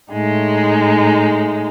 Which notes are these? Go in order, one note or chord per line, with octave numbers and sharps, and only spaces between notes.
A2 G#3 D#4